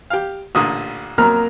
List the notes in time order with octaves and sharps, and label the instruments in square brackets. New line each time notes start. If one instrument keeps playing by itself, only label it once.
[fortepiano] G4 F5
[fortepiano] A1 A#2 D3 [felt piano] D#6
[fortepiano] F2 F#3 [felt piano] A#3 A#5 F6